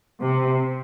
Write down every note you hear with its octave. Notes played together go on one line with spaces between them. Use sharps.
C3